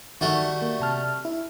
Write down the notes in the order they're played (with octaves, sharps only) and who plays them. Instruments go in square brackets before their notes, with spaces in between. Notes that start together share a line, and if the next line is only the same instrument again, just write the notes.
[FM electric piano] D#3 [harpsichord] G3 A3 F#4
[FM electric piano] A#3
C3 A5 F6
E4